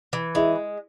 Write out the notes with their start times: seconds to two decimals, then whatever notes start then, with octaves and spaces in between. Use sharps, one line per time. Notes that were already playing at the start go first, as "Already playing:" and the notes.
0.13 E3
0.35 G#3 E4